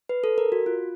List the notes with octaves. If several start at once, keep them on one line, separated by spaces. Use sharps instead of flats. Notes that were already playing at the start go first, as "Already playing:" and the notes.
B4
A4
A#4
F#4
F4